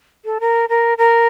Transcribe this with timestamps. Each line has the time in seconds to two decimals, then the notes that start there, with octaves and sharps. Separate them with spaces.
0.25 A4
0.40 A#4
0.69 A#4
0.98 A#4